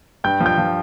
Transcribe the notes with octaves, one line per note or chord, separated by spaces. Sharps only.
G2 G5 G6
F3
G5 G6
F3